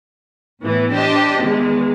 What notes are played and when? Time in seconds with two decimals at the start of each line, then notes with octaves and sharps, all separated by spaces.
0.62 A2 E3 B3
0.91 D4 G4 C5 D#5 A5
1.42 E2 D#3 G#3